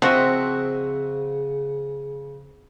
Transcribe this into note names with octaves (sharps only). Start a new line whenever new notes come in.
C#3 F3 C4 F#4 D#5 E5